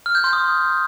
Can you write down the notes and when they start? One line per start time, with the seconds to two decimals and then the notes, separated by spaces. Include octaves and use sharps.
0.06 F6
0.15 G6
0.24 C6
0.33 D#6